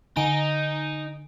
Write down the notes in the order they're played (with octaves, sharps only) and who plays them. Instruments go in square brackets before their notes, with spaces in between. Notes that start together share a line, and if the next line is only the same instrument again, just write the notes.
[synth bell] D3 G#5 D7 [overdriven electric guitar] D#4